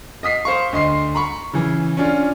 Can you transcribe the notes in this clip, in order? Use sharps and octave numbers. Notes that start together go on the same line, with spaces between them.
D#5 D#6 B6 C7
C5 F5 C#6
D2 D#5 C6 C7
A#5 B5 C#6
C#3 E3
C#4 D4 F4